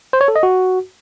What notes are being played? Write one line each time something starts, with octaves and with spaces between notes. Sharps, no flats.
C5
C#5
A4
D#5
F#4